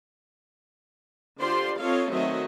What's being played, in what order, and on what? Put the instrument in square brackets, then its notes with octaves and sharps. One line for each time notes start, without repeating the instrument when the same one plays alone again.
[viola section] D3 F4 G4 C5 D5 C6
C4 F4 A4 C#5 D#5 F5
D#3 F#3 A3 C4 D#5 E5